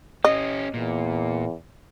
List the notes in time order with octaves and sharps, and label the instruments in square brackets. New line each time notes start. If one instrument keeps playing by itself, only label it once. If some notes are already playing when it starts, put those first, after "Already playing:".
[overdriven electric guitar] C#4 G4 [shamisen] D#5
[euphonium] E2 [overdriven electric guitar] A#2